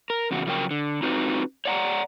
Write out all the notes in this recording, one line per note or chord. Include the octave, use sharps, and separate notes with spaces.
A#4
E2 C#3 F#4
C#3 F3 F#3 C#4 A#4 G5
D3
C4 D#4 F4 F#4 B4
C#5 D5 F#5 G#5 A#5